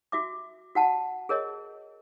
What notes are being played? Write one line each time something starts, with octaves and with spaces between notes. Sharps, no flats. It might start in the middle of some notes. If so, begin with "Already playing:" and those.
F#4 E5 D6
F#4 F#5 A5
G#4 A#4 C#5 D#5